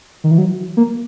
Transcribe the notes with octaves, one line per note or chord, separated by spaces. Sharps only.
D#3
E3
F#3
A#3